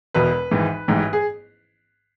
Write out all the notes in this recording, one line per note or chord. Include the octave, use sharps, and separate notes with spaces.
E1 E2 B2 B4
G#1 G#2 E3
A1 G#2 E3
G#4